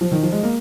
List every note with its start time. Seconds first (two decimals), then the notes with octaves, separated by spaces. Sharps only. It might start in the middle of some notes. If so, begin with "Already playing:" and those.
0.01 F3
0.12 D#3
0.23 F3
0.32 G#3
0.43 A#3